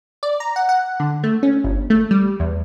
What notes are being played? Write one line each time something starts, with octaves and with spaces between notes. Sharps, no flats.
D5
A#5
F#5
F#5
D3
A3
C#4
G1
A3
G3
E2